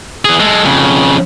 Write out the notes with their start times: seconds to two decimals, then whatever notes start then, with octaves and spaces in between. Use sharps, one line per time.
0.25 E3 G#4
0.40 G#3 A4
0.65 F2 C#3